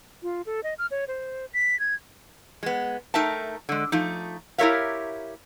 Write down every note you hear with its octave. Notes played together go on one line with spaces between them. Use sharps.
F4
A4
D#5
F6
C#5
C5
B6
G#6
G#3 B3
A3 D#4 A#4 E5 G5 A5
D3 G#3
F3 A3 D#4
E4 G4 A#4 C#5 E5 F5